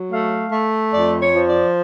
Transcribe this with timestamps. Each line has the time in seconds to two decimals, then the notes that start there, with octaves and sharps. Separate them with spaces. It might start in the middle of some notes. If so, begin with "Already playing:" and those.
Already playing: F#3
0.11 A3 F5
0.52 A3
0.93 F2 D5
1.20 C#5
1.33 F3
1.48 D5